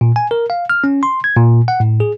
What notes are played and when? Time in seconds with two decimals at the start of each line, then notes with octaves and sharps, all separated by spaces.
0.01 A#2
0.16 G#5
0.31 A#4
0.50 F5
0.70 F6
0.84 C#4
1.03 C6
1.24 G#6
1.37 A#2
1.68 F#5
1.80 A2
2.00 G#4